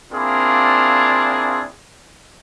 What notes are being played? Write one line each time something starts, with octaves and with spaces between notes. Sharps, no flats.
A#3 C4 D4 E4 F4 G#4